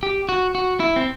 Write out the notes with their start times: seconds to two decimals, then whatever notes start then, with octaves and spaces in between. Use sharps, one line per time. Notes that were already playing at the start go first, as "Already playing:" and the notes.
0.03 G4
0.29 F#4
0.55 F#4
0.80 E4
0.96 C4